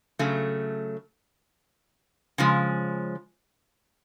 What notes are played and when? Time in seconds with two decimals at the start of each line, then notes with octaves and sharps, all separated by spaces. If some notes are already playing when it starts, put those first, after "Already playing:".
0.19 C#3 F#3 A3
2.38 C#3 F3 G#3